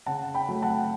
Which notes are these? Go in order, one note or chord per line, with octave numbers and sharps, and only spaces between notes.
C#3 F#5 A5
G5 B5
F#3 A3
F#5 A5